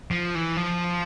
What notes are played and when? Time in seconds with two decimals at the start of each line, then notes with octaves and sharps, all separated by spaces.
0.11 F3
0.35 E3
0.57 F3